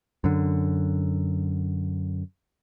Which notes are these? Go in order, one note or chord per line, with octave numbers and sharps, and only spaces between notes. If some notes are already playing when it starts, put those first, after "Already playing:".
F#2 D3